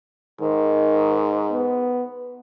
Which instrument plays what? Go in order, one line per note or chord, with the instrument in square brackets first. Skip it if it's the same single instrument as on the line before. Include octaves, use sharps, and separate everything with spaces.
[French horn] G#2 [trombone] D#3
[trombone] B3